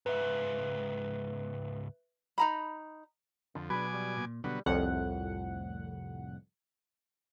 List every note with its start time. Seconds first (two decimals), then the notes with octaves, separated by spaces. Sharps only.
0.06 C#2 G#2 B4 E5
2.38 D#4 A#5 B5
3.55 F2 D3
3.70 B2 F#3 D4 G#4 B4 G#5 D6
3.93 G3
4.17 A#2
4.44 B2 D3 F#3 G3 B3
4.66 C2 F2 A2 F#5